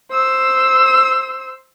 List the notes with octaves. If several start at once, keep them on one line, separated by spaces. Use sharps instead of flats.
C5 E6